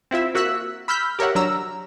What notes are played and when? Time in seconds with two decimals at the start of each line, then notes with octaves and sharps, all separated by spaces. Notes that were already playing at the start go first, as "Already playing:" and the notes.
0.11 C4 E4 F4 E5
0.35 A#3 F#4 E5 E6 F#6
0.88 B5 E6 F6 G6 B6
1.19 G4 A#4 C#5 E5 F#5
1.35 F#3 D4 A#5 E6